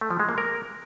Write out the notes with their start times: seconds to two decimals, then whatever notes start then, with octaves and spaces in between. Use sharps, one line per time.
0.01 A3
0.10 F3
0.20 G#3
0.29 A#3
0.38 A#4